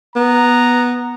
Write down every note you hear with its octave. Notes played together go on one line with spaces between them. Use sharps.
B3 A#5